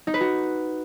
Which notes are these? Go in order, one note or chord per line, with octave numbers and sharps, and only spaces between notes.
D#4
B4
F#4